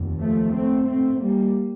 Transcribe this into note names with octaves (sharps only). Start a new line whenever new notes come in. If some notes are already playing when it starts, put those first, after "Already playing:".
Already playing: F1 D#2
F3 A3
A3 C4
A3 C4
G3 A#3